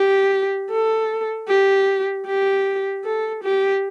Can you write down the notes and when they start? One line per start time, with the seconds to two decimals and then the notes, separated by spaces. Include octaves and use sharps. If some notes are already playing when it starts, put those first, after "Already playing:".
Already playing: G4
0.70 A4
1.48 G4
2.26 G4
3.05 A4
3.44 G4